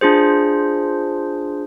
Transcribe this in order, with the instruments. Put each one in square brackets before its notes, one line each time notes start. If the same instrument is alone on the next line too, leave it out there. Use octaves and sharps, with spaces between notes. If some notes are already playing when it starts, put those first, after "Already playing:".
[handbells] D4 F4 G#4 C5